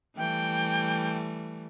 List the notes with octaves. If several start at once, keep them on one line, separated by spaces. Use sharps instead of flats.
E3 G3 A3 G5